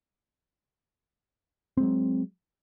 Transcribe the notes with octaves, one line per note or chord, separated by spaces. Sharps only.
F#3 G#3 C4